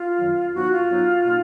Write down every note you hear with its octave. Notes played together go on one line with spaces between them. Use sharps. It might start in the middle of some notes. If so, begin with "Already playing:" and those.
Already playing: F4
F#2 D#3 F#3
G#2 F#3 B3 D#4 F#4
F4
G#2 F#3 B3 D#4
B2 A#3 D#4